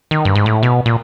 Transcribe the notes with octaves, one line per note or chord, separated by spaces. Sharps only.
D#3
G2
G#2
A2
B2
A#2